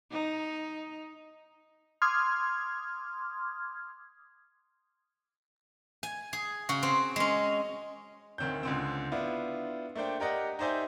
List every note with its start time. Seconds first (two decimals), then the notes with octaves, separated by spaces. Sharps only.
0.12 D#4
2.02 C6 D6 D#6 F6 G#6
6.03 G#5
6.33 G#4
6.69 C#3 F#4
6.83 C4
7.16 G#3 C#4
8.38 D2 D#3 C4 C#5 G6
8.63 C#2 D3 C4
9.12 B3 D4 E4 F4
9.96 A3 A#3 D4 C5 G5
10.20 G4 A#4 D5 D#5 F#5
10.59 D#4 G4 C5 D5 E5 G#5